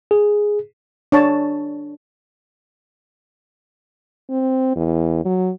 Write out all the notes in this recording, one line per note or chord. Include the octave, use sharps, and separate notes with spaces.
G#4
D4 C#5 A5
C4
E2
F#3